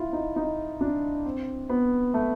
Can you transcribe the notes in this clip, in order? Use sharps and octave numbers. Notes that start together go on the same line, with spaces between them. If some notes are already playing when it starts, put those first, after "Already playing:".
Already playing: E4 F4
D#4
D#4
D4
C4
B3
A3